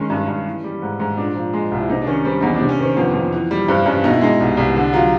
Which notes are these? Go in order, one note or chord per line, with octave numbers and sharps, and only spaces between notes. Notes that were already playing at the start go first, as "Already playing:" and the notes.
Already playing: D#3 G#3 C#4
G2
G2
E3
G3
G#2
G#2
A#2 D4
F3
G#3
C2
E4
C3 D#4
D4
D#3 C#4
G3 C4
E2 D#4
D4
C3
C#4
D#3 C4
F2 B3
F2
E3
G3
G2 C4
G2 C#4
B2 D#4
E4
G#3 D#4
C2
C2
D3
F#3 F4